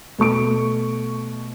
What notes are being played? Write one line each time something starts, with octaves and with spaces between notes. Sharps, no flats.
B2 A3 C#6 D7